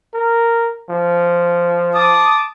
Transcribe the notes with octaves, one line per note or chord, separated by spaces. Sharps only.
A#4
F3
A5 D6 D#6